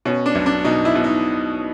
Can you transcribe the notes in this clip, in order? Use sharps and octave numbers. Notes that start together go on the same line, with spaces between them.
B2 C#4
D4
B1
D4
B2 D#4
E4
B2
D#4